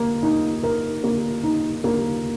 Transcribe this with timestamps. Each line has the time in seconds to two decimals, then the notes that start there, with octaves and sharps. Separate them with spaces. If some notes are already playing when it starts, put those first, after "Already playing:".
Already playing: A#3
0.23 D#4
0.63 A#4
1.04 A#3
1.44 D#4
1.84 A#3